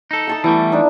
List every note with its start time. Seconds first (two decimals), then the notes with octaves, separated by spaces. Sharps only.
0.11 D#4 A4
0.27 G#5 A5 D#6
0.44 E3 G3 A3 B3 E4 A#4
0.72 D4 D#4